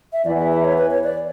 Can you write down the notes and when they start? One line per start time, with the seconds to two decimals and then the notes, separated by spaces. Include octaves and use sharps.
0.13 E5
0.25 E2 E3 D5
0.38 E5
0.52 E5
0.64 C#5
0.78 B4
0.91 C#5
1.04 D5